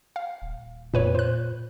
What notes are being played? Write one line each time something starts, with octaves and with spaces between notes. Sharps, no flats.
F5
D#1
F2 A#2 B4 C#5
A#2 C5 F#6